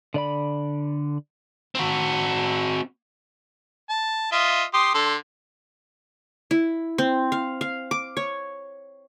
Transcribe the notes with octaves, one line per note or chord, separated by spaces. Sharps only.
D3 D5 B5
C4 F#4
A5
F4 D#5 E5
G4 C6 D#6
D3 A4 C6
E4
C4
F5
F5
D6
C#5